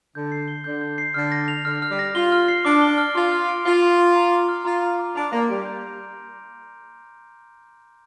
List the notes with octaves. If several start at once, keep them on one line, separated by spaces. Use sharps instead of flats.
D3 G6
C7
G7
D3 G6
G6
C7
D3 F6
A#6
F7
D3 F6
F6
G3
A#6
F4 G7
F6
C7
D4 D6
G7
F6
F4 C6
F6
D7
F4 C6
C6
F6
A#5
D6
F6
F4 A#5
A#5
D6
D4 F7
A#3 A#6
G3 D7
G6